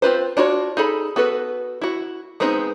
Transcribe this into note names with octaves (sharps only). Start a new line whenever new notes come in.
C4 F4 B4 C5
D4 F4 F#4 C#5
D#4 G#4 A4 B5
B3 F#4 A4 B4
E4 F#4
G#3 B3 C4 D#4 G#4